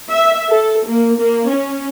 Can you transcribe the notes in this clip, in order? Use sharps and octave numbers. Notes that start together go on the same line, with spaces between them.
E5
A4
A#3
A#3
C#4